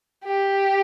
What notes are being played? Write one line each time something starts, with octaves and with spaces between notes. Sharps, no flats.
G4